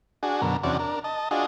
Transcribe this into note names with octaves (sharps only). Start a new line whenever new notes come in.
D4 F#4 G#4
F#2 B2 D3 A#4
E2 C3 C#4 D4 F#4 D5
D4 A#4
D#5 A5
D4 F4 F#4 G#4 D#5